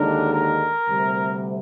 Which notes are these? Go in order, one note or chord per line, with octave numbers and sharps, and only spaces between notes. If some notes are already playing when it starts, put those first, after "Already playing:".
Already playing: D#2 D3 G#3 D4 A#4
A#4
D2 C3 G3